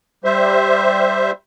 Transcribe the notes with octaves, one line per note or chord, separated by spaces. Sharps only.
G3 C5 E5